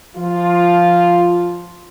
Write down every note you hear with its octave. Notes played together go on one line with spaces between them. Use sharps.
F3 F4